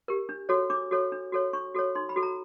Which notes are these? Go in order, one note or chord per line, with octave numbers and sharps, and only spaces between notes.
G4 A#4
D4
F#4 A4 C#5
D4 D6
F#4 A4 C#5
D4
F#4 A4 C#5
D4 C#6
F#4 A4 C#5
D#4 C6
B5
F#4 A4
A#5